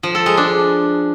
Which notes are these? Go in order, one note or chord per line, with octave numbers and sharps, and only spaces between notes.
F3
A4
G#3
D4